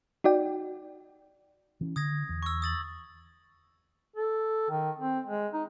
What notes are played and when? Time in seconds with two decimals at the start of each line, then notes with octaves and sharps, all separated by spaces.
0.24 D#4 F#4 D5 G5
1.81 E3 C#4
1.96 D3 D#6 G#6 A#6
2.29 E2
2.43 C#6 E6
2.62 D#6 A6 F#7
4.16 A4
4.70 D#3
4.99 C4
5.27 G#3
5.53 D#4